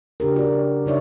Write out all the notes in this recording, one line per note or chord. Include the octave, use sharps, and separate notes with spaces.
C#3 D4 G4 A#4
F#4 D5
C#3 D#4 C#5 D5 E5